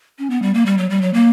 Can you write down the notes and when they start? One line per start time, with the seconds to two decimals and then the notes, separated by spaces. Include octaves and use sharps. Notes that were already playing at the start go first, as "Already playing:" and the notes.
0.19 C#4
0.30 B3
0.42 G3
0.54 A#3
0.66 G3
0.78 F#3
0.90 G3
1.02 F#3
1.14 A#3